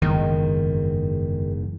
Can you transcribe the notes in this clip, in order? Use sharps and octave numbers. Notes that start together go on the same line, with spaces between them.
F#1 E2 G#2 D#3